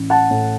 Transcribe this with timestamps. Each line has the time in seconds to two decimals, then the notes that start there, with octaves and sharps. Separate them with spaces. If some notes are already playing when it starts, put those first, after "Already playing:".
Already playing: A1
0.10 F#5 A5
0.30 A2